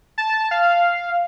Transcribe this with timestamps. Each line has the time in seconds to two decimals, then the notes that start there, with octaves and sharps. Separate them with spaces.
0.18 A5
0.51 F5